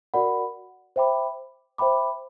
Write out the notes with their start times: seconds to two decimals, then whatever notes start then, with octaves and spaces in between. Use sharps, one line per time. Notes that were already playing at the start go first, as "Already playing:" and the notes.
0.14 F#4 A#4 D5 F#5 B5
0.96 C5 E5 G5 B5 D6
1.78 C5 E5 G5 B5 D6